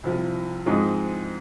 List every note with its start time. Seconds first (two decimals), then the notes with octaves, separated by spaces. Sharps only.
0.04 C2 C3 F3
0.66 G#2 F3 G#3 C4 D#4